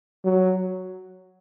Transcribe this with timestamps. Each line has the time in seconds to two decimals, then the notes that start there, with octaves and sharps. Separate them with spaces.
0.25 F#3